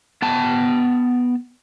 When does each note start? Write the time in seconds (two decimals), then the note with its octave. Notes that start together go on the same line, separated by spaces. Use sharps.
0.22 B3 G5 A5